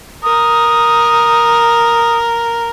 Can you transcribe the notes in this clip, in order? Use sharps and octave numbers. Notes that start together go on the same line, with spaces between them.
A#4 D#6